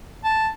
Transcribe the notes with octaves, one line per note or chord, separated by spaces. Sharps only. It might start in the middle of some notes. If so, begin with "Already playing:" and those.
A5